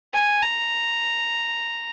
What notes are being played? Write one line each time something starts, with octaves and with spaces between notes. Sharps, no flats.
G#5
A#5